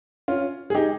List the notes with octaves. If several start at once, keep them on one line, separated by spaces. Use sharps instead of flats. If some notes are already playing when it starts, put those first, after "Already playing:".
C#4 F4
G#4
D#4 G4